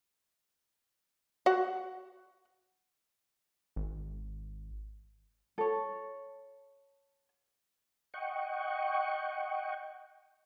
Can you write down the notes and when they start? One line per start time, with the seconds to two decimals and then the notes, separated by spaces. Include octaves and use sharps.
1.46 F#4 F#5
3.76 G#1
5.58 A4 C#5
8.14 D#5 F#5 G5 C#6